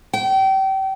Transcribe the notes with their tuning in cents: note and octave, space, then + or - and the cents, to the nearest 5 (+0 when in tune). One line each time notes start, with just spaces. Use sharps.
G5 -30